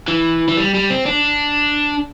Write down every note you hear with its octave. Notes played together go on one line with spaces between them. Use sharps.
E3
E3
G3
G3
C4
D4